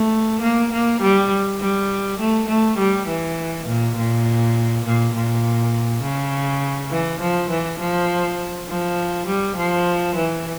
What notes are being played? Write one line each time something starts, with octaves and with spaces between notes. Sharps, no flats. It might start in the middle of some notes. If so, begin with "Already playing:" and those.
Already playing: A3
A#3
A#3
G3
G3
A3
A3
G3
E3
A#2
A#2
A#2
A#2
C#3
E3
F3
E3
F3
F3
G3
F3
E3